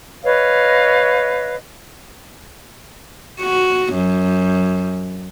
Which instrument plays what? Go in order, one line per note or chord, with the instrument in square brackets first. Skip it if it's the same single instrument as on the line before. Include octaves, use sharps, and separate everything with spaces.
[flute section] B4 C#5 D#5 F5
[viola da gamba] F#4
F#2